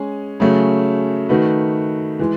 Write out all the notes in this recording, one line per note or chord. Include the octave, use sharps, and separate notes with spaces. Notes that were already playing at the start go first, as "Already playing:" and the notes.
Already playing: G#3 C#4 G#4
C#3 F#3 A3 C#4
D#3 A3 D#4 F#4 B4
E3 G#3